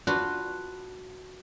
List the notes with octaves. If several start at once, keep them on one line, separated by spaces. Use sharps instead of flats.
D4 F4 F#4 B4